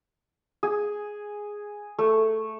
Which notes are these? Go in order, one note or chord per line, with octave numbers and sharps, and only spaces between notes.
G#4
A3